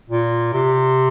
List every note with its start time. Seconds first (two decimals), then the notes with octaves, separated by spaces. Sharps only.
0.10 A#2
0.54 C3